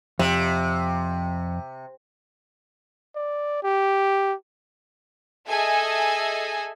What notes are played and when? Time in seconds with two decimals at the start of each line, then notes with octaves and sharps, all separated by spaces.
0.19 F2 C3
3.16 D5
3.63 G4
5.47 G#4 A4 D#5 E5 G#5